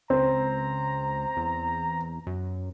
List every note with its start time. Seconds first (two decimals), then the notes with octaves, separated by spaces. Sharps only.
0.10 C#2 C4 A#5
1.37 E2
2.27 F#2